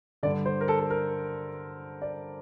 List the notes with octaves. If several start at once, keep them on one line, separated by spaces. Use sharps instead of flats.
G2 D3 D5
C5
A#4
A4
A4
A#4
D5